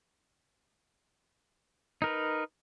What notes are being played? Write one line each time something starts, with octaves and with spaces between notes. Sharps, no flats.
D#4 A#4 B4